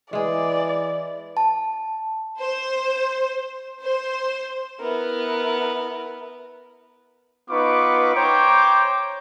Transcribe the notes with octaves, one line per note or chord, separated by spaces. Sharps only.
E3 G#3 G#4 D5
A5
C5
C5
B3 E4 A#4
B3 D#4 F4 B4 C#6 D6
C5 C#5 G5 A#5 D6